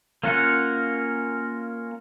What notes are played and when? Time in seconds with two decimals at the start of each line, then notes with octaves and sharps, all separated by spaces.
0.23 A#3 C#4 F4 A#4 F#5